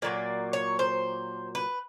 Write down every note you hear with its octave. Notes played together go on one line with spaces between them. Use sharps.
A#2 F#3 A#3 D5
C#5
C5
B4